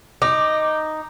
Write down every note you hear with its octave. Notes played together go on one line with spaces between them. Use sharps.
D#4 D6